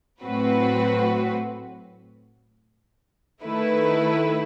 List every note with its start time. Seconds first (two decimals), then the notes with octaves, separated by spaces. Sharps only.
0.23 A2 F#3 C4 F#4 B4
3.43 D#3 A3 E4 B4